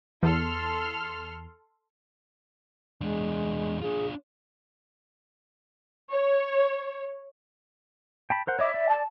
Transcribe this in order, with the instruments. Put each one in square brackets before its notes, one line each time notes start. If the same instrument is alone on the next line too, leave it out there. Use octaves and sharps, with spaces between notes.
[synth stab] E2 [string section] A4 C6 F6
[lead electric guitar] E2 D4 [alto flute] G#3
[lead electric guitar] D4 F4 [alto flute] G#4
[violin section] C#5
[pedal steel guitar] G5 A5 B5
A#4 C5 F#5
[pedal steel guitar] C#5 D#5 D6 [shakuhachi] E5
[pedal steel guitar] D5
[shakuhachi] A5